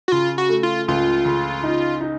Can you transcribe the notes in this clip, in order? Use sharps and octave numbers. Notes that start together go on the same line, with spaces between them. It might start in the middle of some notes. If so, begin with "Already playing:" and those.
F#4
C#3 F4
F#4
A3
F4
C#2 F4
C#3
D#4
D#4